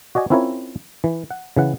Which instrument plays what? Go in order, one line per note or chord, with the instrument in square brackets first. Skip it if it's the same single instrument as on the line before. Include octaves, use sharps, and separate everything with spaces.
[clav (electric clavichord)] F#4 D5 D#5 G#5
C4 C#4 E4 F4 A#4 C#5
E3
F#5
C#3 E3 F#5